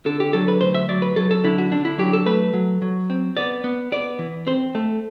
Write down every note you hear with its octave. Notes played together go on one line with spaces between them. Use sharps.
D3 A4
G4
F#3 A4
B4
D2 C5
E5
F#3 D5
B4
F#3 A4
A4
D3 E4
F#4
D3 D4
E4
F#3 G4
A4
A3 B4
F#3
F#3
C4
B3 D5
B3
B3 D5
E3
C4 C5
A3